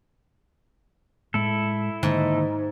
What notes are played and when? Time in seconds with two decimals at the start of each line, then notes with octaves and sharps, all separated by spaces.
1.34 A2 G#3 A3 E4 A4
2.03 G#2 D3 D#3 A#3